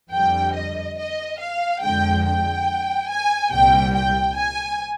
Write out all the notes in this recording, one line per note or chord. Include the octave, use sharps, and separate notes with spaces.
F2 D3 G3 G5
D#5
D#5
F5
F2 D3 G#3 G5
G5
G#5
C2 A#2 G3 G5
G5
G#5